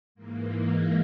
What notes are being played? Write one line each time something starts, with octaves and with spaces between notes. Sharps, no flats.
G#2 E3 A#3
G#3